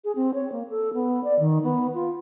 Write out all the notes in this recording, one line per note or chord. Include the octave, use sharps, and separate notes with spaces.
G#4
C4
C#5
A#3
A4
B3
D5
D#3
B3
F4